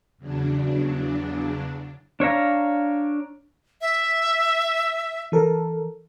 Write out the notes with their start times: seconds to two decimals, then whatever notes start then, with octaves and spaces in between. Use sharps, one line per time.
0.18 E2 C#3 F#3 D4
2.20 D4 C#5 F5 A#5
3.81 E5
5.32 E3 A4 A#4